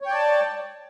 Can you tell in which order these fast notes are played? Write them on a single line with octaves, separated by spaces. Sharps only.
C#5 G5 D5 A5